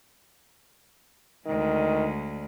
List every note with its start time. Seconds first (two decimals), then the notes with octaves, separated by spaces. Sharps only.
1.46 D2 D#3 G#3